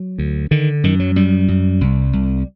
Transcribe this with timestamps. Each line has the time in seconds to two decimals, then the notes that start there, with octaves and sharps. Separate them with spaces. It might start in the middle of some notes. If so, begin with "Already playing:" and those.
Already playing: F#3
0.18 D2
0.51 D3 D#3
0.84 F#2 D#3
1.00 F#3
1.16 F#2 G3
1.48 F#2
1.81 C2
2.13 C2